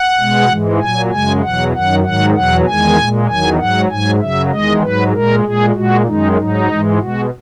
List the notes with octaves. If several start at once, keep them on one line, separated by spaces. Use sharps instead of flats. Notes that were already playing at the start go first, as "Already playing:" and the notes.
Already playing: F#5
B2 G#3
G#2 E3 G#3
A#2 F#3 G#5
F#2 C#3 G#3 G#5
E2 B2 F#3 F#5
F#2 D#3 F#3 F#5
G#2 D#3 F#3 F#5
E2 B2 F#3 F#5
E2 D#3 G#3 G#5
A#2 G#3
E2 D#3 F#3 G#5
G#2 F#3 F#5
G#2 F#3 G#5
F#2 C#3 F#3 E5
E2 D#3 G#3 D#5
G#2 F#3 B4
A#2 G#3 A#4
A#2 G#3 G#4
A#2 G#3 F#4
F#2 D#3 G#3 D#4
G#2 F#3 D#4
G#2 E3 G#3
B2 G#3 F#4